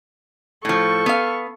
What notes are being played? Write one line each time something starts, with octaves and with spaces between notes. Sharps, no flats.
A2 F3 A4 C#6
B3 F5